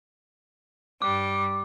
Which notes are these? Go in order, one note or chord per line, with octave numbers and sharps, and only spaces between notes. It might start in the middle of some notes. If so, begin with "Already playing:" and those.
G2 G3 D6